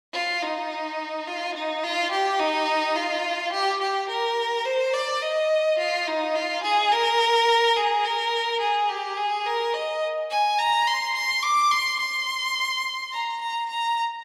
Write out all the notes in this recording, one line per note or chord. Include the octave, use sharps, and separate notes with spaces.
F4
D#4
F4
D#4
F4
G4
D#4
F4
G4
G4
A#4
C5
D5
D#5
F4
D#4
F4
G#4
A#4
G#4
A#4
G#4
G4
G#4
A#4
D#5
G#5
A#5
C6
C6
D6
C6
C6
A#5
A#5
A#5